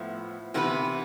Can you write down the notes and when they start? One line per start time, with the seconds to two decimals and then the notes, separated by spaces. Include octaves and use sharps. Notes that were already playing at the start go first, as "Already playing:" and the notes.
Already playing: A2 F3 B3 E4
0.54 C3 E3 B3 E4 B4